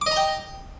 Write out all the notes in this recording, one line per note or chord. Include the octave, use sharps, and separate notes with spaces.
D#5 G5 A#5 D6